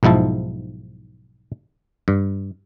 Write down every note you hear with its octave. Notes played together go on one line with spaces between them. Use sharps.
B1 G#2 F3 E4 A5
G2